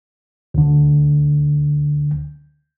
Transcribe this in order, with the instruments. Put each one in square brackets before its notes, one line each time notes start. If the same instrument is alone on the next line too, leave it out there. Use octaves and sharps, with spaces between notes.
[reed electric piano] D2 D3